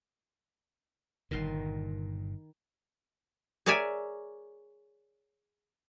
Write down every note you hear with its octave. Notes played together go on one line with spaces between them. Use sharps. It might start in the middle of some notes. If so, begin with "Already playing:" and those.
G1 G2 A#2 D#3 C6
G#4 A#4 C#5 D5 E5 G#5